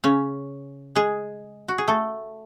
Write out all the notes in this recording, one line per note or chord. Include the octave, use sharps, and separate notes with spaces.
C#3 C#4
G#3 G#4
F#4
G#4
A3 A4